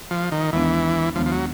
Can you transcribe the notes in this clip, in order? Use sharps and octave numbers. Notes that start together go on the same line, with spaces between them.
F3
D#3
D#2 D#3 E3 G#3 B3 D4
D#2 D#3 F3 G#3 B3 D4
F3
F#3